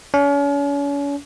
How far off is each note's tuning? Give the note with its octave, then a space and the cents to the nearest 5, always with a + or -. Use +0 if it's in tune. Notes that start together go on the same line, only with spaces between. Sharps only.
C#4 +40